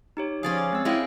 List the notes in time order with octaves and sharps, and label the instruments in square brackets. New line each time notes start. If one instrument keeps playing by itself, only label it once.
[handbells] D#4 G4 C#5
[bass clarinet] F3 [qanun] C#4 D5 F5 [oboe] G#4
[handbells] D6 A6
[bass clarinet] G#3 [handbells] C4 E6
[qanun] G#3 C#4 A#4 [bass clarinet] E4 [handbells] D#5 F5 G5